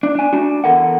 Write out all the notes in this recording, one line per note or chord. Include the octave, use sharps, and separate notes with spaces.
D4
D4 G#5
D4 F#4
E2 A4 A#4 F#5